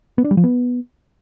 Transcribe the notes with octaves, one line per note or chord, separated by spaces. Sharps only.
B3
D4
G3
F3
B3